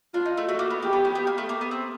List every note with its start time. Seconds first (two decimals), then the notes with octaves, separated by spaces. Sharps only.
0.14 D4 F4
0.25 D#4
0.37 A3
0.48 A3 F#4
0.59 A#3
0.70 B3
0.82 A#3 G4
0.93 B3
1.05 C#4
1.15 B3
1.27 A#3
1.38 A3
1.49 A#3
1.61 B3
1.71 C4